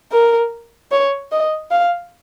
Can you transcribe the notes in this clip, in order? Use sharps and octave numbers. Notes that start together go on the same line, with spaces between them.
A#4
C#5
D#5
F5